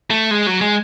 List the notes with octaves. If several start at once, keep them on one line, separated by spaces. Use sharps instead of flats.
A3
G#3
F#3
G#3